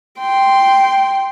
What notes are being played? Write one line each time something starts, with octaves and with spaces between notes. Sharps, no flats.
G5 C6